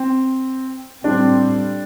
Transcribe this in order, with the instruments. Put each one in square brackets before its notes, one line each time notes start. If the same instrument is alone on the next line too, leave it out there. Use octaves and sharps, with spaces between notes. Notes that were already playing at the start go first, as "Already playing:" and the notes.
Already playing: [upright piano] C4
[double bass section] A2 G3 C4 [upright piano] D4